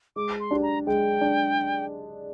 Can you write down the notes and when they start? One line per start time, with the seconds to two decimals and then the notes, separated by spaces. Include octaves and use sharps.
0.16 G#3 D6
0.40 C6
0.51 D4 G4
0.63 A#5
0.86 G#3 G5
1.21 D4